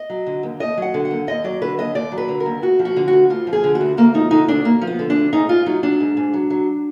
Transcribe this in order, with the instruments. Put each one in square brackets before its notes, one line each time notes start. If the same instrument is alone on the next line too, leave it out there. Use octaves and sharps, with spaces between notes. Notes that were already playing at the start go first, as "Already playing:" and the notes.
Already playing: [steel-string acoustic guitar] D#5
F#3
D3
D#2
D#2 D#5
F#3 F#5
D3
F#5
D#2
D#2 D#5
F#3 D5
D3 B4
D#2 D#5
D#2 D5
F#3
B4
D3
A#4
D#2
D2 F#4
F3
F#4
D3
F#4
D2
D2 F4
F3
G#4
D3
F#4
D2
D2 A#3
F3 D#4
D3 D#4
D2 D4
D2 A#3
F3
B3
D3
D4
D2
G#2 D#4
G#2 F4
F#3 D#4
F#3 D4
G#2
G#2
F#3
F#3